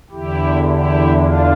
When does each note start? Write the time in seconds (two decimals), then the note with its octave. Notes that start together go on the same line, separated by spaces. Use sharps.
0.10 E2 D3 E4 G4
0.65 E4 G4
1.18 D4 F4